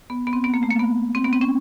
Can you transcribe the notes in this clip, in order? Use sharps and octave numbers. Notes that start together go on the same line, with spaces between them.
B3
B3
C4
B3
A#3
A3
A#3
B3
C4
B3
C4
C#4